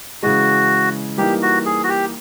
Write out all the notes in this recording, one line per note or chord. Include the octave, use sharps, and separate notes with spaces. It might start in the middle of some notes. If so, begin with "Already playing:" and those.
C#3 E3 G#3 F#4
E3 G3 A#3 D#4 G4
F#4
G#4
F#4
G4